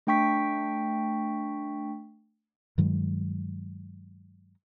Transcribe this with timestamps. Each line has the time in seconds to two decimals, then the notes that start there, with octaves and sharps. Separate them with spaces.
0.07 A3 D4 G5 C#6 B6
2.78 G2 D#3 F#3 G#3